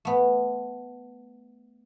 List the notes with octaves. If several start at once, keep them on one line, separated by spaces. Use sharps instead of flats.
A3 B3